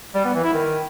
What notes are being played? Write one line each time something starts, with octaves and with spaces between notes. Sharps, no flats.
G3
B3
E3
E4
D#3